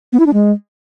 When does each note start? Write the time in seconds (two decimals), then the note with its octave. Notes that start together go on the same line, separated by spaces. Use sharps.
0.13 B3
0.20 E4
0.26 D4
0.33 G#3